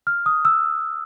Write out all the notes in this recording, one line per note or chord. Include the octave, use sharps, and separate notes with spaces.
F6
D#6
E6